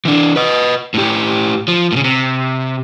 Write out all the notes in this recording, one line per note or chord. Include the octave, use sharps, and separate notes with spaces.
E3 D4
B4 D#5
A2 G4
F3
A2 C#3
C3